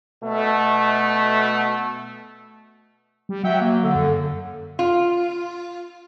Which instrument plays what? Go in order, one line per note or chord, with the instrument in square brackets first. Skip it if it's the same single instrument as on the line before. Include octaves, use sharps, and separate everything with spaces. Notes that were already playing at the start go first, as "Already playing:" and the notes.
[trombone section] B2 A3
[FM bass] G3
[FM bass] F#3 [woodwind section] E5 F#5 G5
[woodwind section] A#3
D3
[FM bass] F#2
[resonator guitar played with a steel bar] F4